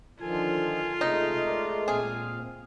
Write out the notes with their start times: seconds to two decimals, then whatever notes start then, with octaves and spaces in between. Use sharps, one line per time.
0.21 D3 D#3 F3 F4 A4 G#5
1.01 C3 G#3 A3 D#4
1.47 A#4 D5
1.88 A#2 C4 G#4 F5